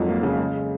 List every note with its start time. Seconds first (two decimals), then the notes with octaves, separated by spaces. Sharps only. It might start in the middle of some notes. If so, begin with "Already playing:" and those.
Already playing: F2 G#2 F#3
0.08 A#3
0.23 C#3
0.39 G#3